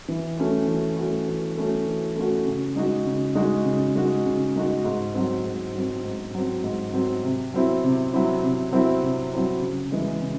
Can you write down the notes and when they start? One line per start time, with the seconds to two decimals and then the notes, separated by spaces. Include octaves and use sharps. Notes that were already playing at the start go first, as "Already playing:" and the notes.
0.08 E3
0.37 A3 C#4 F#4
0.67 E3
0.97 A3 C#4 F#4
1.28 E3
1.57 A3 C#4 F#4
1.87 E3
2.16 A3 C#4 F#4
2.46 C#3
2.76 G#3 D#4 F#4
3.06 C#3
3.35 G#3 D#4 F#4
3.66 C#3
3.95 G#3 D#4 F#4
4.26 C#3
4.56 G#3 D#4 F#4
4.85 G#2
5.14 F#3 C4
5.45 G#2
5.75 F#3 C4
6.04 G#2
6.35 F#3 C4
6.63 G#2
6.93 F#3 C4
7.23 C3
7.54 F#3 C4 E4
7.84 C3
8.13 F#3 C4 E4
8.43 C3
8.72 F#3 C4 E4
9.03 C3
9.33 F#3 C4 E4
9.62 C#3
9.92 E3 G#3
10.22 C#3